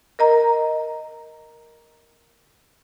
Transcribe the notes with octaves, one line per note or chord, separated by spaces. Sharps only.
A#4 D#5 A#5